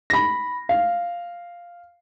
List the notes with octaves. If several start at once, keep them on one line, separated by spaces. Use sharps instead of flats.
B5 A#6
F5